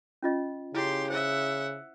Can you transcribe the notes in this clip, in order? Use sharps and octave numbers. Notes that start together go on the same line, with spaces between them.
C#4 F4 D#5
C#3 E4 G4 C6
C5 E5 F#5